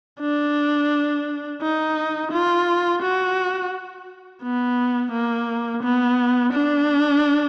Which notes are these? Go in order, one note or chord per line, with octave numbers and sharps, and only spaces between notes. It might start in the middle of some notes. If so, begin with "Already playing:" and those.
D4
D#4
F4
F#4
B3
A#3
B3
D4